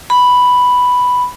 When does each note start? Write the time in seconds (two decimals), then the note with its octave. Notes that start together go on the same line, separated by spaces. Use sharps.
0.10 B5